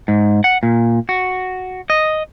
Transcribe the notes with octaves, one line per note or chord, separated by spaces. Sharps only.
G#2
F#5
A#2
F#4
D#5